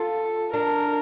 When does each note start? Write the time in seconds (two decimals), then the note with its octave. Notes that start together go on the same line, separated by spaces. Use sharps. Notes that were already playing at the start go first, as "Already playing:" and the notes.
Already playing: F4 A4
0.53 D4 A#4